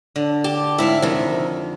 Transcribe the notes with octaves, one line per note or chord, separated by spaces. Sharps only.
D3
G4 A5
G#2 E4 E5 F5
F2 C3 D#3